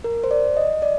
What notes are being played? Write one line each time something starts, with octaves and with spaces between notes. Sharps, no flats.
A#4
C5
D5
D#5
D5